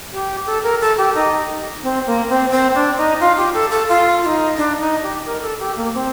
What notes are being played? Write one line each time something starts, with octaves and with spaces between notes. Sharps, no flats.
G4
A4
A#4
A4
G4
D#4
C4
A#3
C4
C4
D4
D#4
F4
G4
A4
A4
F4
F4
D#4
D4
D#4
G4
A#4
A4
G4
A#3
C4